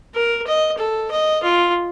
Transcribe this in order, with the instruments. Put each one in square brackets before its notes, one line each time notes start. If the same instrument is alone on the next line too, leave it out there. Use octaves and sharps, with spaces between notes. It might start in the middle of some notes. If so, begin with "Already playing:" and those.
[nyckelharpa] A#4
D#5
A4
D#5
F4